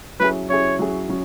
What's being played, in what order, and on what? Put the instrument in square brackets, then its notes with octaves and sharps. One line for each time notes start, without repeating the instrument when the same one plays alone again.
[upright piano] F#3 C#4 E4 G#4 [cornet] B4
[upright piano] F#3 C#4 E4 G#4 [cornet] C#5
[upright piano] F#3 C#4 E4 G#4
F#3 C#4